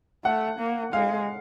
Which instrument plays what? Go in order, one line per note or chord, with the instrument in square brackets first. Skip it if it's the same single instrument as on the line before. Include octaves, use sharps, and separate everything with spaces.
[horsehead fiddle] A3 [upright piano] F#5
[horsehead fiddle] A#3
[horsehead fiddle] G#3 [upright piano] F5